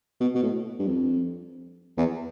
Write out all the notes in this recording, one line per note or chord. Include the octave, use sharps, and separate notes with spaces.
B2
B2
A2
G2
F2
E2